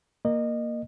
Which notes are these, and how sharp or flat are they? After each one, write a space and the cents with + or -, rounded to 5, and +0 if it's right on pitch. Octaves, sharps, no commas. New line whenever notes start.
A#3 +0 D#5 -25